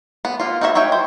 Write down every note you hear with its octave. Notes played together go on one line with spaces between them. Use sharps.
B3
A#3 F4
D#4 E4 F#4 A4 E5
D#4 C#5 E5 G5
C5